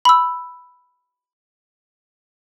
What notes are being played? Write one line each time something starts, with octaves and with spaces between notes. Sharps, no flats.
B5 E6